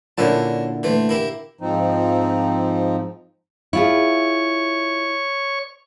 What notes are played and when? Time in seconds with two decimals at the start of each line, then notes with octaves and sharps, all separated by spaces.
0.18 A#2 D3 A#3 C#4 E4 A5
0.83 E3 A3 C5
1.09 A#3 E4 G4
1.60 G#2 F3 C4 D#4
3.73 E4 F4 G#4 C#5 C#6